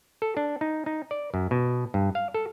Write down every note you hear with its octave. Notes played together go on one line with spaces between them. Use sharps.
A4
D4
D#4
D#4
D5
F#2
B2
G2
F5
A4